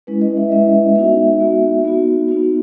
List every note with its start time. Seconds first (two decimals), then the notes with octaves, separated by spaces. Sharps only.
0.07 G#3 C#4 E4 B4
0.22 D#5
0.37 E5
0.52 G#3 C#4 E4 E5
0.95 B3 D#4 F#4 E5
1.40 B3 D#4 F#4
1.84 B3 D#4 F#4
2.28 B3 D#4 F#4